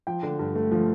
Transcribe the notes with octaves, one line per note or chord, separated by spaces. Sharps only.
F3 G5
D3
G2
A3
F3